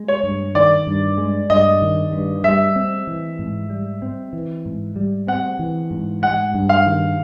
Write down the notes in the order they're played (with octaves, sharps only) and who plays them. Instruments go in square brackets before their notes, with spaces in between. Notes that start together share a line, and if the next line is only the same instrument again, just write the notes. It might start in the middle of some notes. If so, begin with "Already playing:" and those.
Already playing: [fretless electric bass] G#3
[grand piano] C#5
[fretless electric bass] G2
[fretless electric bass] D#3 [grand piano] D5
[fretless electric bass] G2
G#3
[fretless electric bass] G2 [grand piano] D#5
[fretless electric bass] D#3
G2
[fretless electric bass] G3 [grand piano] E5
[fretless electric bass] C4
E3
G#2
G3
C4
E3
G#2
G3
[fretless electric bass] C4 [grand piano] F#5
[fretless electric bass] E3
G#2
[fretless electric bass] G#3 [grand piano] F#5
[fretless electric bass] G2
[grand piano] F5
[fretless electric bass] D#3